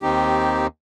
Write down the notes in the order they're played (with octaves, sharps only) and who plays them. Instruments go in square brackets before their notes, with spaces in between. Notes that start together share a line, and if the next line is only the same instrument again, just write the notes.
[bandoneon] D#2 D#3 C4 D#4 G4